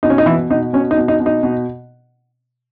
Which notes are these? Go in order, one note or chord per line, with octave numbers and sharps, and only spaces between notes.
B2 D#4
C#4
D#4
B2 E3 E4
B2 D#4
B2 C#4
D#4
B2
D#4
B2
D#4
B2